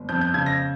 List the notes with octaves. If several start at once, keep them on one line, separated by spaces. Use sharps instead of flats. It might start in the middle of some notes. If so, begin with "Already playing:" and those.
Already playing: G1
F2 G6
G6
C#3 G#6
A#6